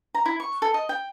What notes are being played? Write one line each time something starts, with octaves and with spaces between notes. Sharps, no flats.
A#5
E4
C#6
A4
D#5
G5